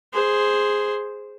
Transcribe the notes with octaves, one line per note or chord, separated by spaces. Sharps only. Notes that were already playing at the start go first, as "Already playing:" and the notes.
G#4 C5